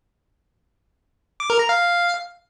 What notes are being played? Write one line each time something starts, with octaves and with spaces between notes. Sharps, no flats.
D6
A#4
A#5
F5